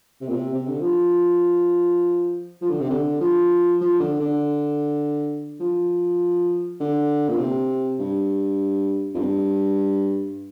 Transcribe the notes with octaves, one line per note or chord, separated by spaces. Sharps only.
C3
A#2
C3
C3
D3
F3
F3
D3
C3
D3
F3
F3
D3
D3
F3
D3
A#2
C3
G2
F2
G2